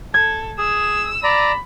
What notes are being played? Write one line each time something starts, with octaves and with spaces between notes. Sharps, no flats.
A4 G#6
G#4 E6
D5 A#5 B5